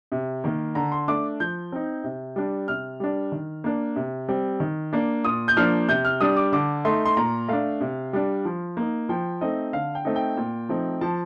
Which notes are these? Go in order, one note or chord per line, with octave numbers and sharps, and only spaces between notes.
C3
D#3 A#3
D3 A#5
C6
A3 D4 D6
F3 G6
C4 D#4
C3
G3 D4
C3 F6
G3 D4
D#3
A#3 D4
C3
G3 C4
D#3
A#3 D4
A#2 D#6
G6
F3 A#3 D4 F6
C3 G6
F6
G3 D4 D#6
D6
D3 D6
A3 D#4 C6
C6
A#2 A#5
A3 D4 F5
C3
G3 D4
F3
A#3 D#4
F3 G5
A3 C4 D#4 D#5
D3 F5
G5
A3 C4 D#4
G5
A#2
F3 A3 C4 D#4
F3 A5